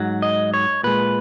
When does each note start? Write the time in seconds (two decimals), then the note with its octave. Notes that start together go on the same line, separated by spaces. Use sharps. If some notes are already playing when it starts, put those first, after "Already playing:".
Already playing: G#2 F#3
0.22 D#5
0.54 C#5
0.83 A#2 G#3 B4